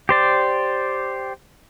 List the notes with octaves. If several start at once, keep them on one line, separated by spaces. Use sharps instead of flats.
G4 C5 D5